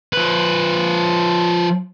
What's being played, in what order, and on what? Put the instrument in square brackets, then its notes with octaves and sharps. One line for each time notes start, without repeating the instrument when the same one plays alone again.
[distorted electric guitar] F3 B4